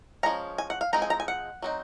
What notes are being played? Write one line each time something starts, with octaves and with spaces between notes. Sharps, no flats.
F3 G#3 C#4 A#5
G#5
F#5
F5
F3 G#3 C4 D#4 A#5
G#5
A#5
G#5
F#5
F#3 C4 D#4